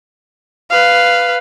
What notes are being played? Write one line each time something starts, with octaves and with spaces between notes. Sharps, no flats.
B4 F5